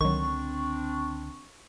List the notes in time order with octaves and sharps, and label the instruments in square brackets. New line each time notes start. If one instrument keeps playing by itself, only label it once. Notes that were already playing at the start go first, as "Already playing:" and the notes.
[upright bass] C#2 D3 [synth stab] D#3 F#3 [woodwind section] C4 D4 [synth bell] C#6